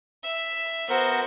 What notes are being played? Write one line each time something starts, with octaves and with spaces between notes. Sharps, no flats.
E5
B3 F#4 A#4 C5